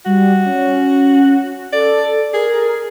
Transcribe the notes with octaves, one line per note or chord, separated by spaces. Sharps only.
G3 F#4
C#4
A4 D5
G#4 A#4